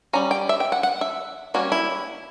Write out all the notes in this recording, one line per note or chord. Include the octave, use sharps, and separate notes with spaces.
G3 C#4 A#5
G5
E5
G5
F#5
F#5
E5
G3 A#3 C#4 F#4
E4